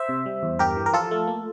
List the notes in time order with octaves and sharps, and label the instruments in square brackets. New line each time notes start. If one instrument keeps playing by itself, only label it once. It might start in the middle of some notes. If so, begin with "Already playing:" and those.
Already playing: [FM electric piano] C5 E5
C3
G3
E2
G2 G4 A#4
E3
A#4
F3 F4 A4
A3
A#3